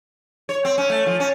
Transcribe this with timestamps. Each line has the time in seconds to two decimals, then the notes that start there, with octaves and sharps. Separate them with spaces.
0.49 C#5
0.65 C4
0.78 C#4
0.90 A3
1.06 F3
1.20 C#4